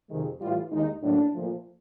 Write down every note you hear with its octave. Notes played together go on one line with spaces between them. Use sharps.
F2 C3 D#3 G#3
A2 E3 G3 F4
D#2 D#3 G#3 D#4
A2 F#3 A#3 D4
A#2 F3 A3